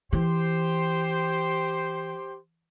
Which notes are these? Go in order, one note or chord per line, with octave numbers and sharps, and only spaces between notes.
E3 G4 C5